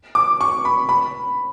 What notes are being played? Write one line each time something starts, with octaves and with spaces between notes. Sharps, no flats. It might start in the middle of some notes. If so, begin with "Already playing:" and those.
D6
C#6
B5
B5